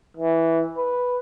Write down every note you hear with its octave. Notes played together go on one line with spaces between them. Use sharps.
E3
B4